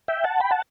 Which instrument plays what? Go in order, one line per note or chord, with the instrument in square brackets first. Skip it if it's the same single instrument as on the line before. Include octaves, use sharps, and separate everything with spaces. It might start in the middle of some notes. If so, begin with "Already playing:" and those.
[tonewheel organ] E5 G5
F#5 A5
G5 B5
F#5 A5